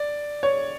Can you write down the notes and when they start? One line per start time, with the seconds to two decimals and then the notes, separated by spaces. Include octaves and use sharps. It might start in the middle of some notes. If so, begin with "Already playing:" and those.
Already playing: D5
0.43 C#5